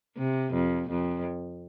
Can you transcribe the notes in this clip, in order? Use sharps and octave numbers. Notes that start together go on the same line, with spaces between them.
C3
F2
F2